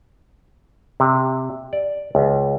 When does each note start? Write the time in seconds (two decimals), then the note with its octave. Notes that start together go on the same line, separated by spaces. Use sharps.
1.00 C3
1.73 D5
2.15 C#2